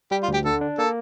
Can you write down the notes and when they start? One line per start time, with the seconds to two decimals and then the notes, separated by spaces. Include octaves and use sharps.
0.11 G3 G4
0.23 F4
0.28 D2
0.34 G4
0.45 D3 A4
0.61 D4
0.78 A#3 A4